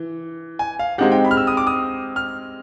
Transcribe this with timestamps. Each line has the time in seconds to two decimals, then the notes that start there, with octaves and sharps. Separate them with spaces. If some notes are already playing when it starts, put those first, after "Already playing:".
Already playing: E3
0.59 G#5
0.79 F5
0.98 G#3 C4 D#4 G4 F#5
1.12 G5
1.25 B5
1.31 F6
1.37 E6
1.47 D#6
1.57 D6
1.67 D#6
2.16 F6